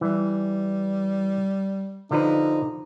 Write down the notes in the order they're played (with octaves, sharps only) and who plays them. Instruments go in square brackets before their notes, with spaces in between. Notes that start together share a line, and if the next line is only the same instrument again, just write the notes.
[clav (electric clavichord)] E3 [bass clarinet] G3
[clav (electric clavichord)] D3 F3 B4 [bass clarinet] D#4